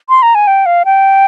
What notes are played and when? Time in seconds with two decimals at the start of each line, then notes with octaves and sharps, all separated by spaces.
0.09 C6
0.22 A#5
0.35 G#5
0.47 G5
0.66 F5
0.85 G5